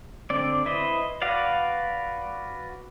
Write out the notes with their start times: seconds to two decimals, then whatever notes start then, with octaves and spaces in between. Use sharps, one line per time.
0.30 D3 C4 D5
0.66 E4 B4 C5 D#5
1.22 F#4 B4 D5 F5 F#5